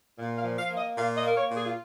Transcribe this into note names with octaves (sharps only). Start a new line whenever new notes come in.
A#2
F5
F3
F5
A#3
D#5
A#2 F5
D#5
A#3 A#4
C#5
A#2
G#4
F4